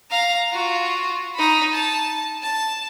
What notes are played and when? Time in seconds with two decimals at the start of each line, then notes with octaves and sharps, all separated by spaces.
0.10 F5 A#5
0.51 F4 F#4
1.35 D#4 B5
1.72 A5
2.42 A5